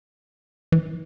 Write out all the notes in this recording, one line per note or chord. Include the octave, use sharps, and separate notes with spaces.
E3